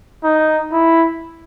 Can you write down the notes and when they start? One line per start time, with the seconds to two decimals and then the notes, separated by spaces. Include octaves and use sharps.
0.24 D#4
0.72 E4